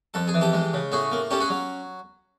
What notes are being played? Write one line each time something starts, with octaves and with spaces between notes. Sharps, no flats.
F2 A4
G#4
E3
G4 A4
G#3
C#3
A2 F#4 G#4
A#3
C#4 G4 A4
F#4 G#4
F#3